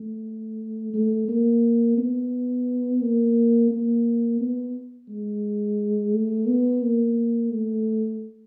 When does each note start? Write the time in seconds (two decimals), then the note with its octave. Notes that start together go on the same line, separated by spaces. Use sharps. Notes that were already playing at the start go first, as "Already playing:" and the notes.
Already playing: A3
0.94 A3
1.28 A#3
1.98 B3
3.02 A#3
3.71 A#3
4.40 B3
5.09 G#3
6.14 A3
6.48 B3
6.83 A#3
7.52 A3